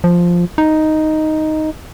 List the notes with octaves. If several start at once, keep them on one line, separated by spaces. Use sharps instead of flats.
F3
D#4